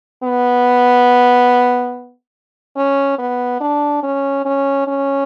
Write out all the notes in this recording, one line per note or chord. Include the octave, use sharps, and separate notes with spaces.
B3
C#4
B3
D4
C#4
C#4
C#4